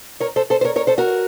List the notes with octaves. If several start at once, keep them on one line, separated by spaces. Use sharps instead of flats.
A#4 C#5
A4 C5
A4 C5
C5
A#4 C#5
A#4 C#5
A4 C5
F#4 A#4